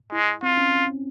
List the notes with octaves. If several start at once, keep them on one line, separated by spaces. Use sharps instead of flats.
G#3 E4
C4 F4
C#4